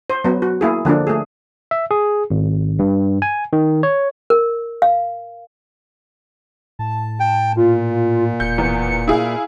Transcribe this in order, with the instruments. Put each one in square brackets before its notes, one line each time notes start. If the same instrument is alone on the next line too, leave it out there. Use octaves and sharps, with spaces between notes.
[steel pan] C5
F#3 B3
F#4
A#3 E4 G#4
D3 F3 A#3 D4
A3 G#4
[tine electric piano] E5
G#4
G#1
G2
G#5
D#3
C#5
[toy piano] A#4
F5
[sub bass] A2 [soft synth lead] A5
[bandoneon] G5
[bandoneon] A#2 [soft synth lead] F4
[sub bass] E1 [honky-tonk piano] G6 [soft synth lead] C#7
[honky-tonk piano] E2
E4 G#4 F5